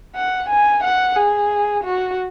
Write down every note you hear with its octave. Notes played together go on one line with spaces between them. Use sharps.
F#5
G#5
F#5
G#4
F#4